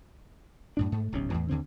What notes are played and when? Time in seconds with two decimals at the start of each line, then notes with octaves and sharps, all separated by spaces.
0.77 F#2 A2 D4
0.92 G#2 A3
1.12 D1 B1 C3 C#4
1.30 E2 A2 E3
1.49 D#2 D3 C4